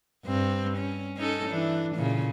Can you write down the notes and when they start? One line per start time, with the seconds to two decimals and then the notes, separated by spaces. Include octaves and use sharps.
0.25 G2 C4
0.77 C#4
1.17 C#4 D#4 A4
1.49 E3 D4
1.95 A#2 C#3